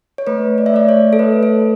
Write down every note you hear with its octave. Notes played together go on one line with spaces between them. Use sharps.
C#5
A3 B4
D5
E5
A3 D5
C#5
A4
A3 B4
A4